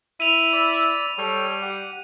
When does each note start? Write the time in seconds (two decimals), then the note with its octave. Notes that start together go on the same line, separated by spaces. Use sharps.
0.20 E4 B5 D#7 F7
0.52 D5 B5 E6
1.18 G3 A4 C#5 G5
1.62 G4 F#5